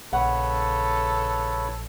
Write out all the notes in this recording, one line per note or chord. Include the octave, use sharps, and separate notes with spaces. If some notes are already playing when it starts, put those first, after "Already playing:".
A#1 C#3 A4 B4 C#5 F#5